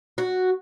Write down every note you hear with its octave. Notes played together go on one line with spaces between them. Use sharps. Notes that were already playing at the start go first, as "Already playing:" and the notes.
F#4